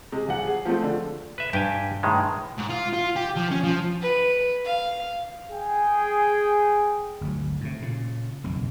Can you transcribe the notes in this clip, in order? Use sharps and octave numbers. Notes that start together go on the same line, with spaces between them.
C3 G#3
D#1 F#5
G#4
F3 G#3 A3 C4
D3
B4 E5
G2 G4 G5 G#5
A2 D#3 G#3
G#2
F4
F4
G4
F3
C#4
F3
B4
F5
G#4 G5
G1 D2 F#3
A2 C3
A#2 C#3
F#1 B1 F2 D#3